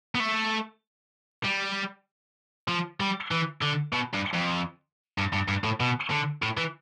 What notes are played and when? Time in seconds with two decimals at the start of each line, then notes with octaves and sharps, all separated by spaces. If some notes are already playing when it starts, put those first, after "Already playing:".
0.15 B3
0.20 A3
1.44 G3
2.68 F3
3.00 G3
3.31 E3
3.61 D3
3.93 B2
4.14 G2
4.34 F2
5.18 G2
5.33 G2
5.48 G2
5.64 A2
5.80 B2
6.11 D3
6.43 A2
6.57 E3